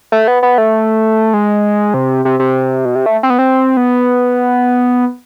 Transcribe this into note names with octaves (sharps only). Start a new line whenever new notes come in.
A3
B3
B3
A3
G#3
C3
C3
C3
B2
C3
A3
C4
B3
C4
B3